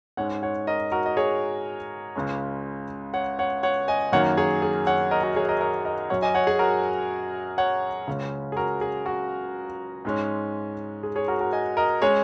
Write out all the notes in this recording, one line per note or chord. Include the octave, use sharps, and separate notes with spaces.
G#2 G#3 C#4 C#5 F#5
C#5 F#5
A#4 D#5
F#4 A#4
D#5
G#4 C#5
C#2 C#3 G#3 C#4
C#5 F#5
C#5 F#5
C#5 F#5
D#5 G#5
F#2 D#3 F#3 A#3 C#5 F#5
G#4 C#5
G#4
C#5 F#5
A#4 D#5
F#4 A#4
G#4 C#5
A#4 D#5
A#4 D#5
A#4 D#5
F#2 F#3 C#4 C#5 F#5
D#5 G#5
C#5 F#5
G#4
F#4 A#4
C#5 F#5
C#2 C#3 G#3 C#4
G#4
F#4 A#4
G#4
F#4
G#2 G#3 C#4
G#4
G#4 C#5
F#4 A#4
F#4 A#4
D#5 G#5
A#4 D#5
G#3 C#4 G#4 C#5